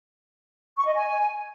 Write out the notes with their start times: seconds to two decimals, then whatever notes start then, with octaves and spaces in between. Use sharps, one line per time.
0.76 C#6
0.85 D#5
0.94 G#5